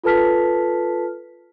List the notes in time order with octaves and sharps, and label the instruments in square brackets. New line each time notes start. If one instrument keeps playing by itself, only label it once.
[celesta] F4 A4 B4 A5 F6 B6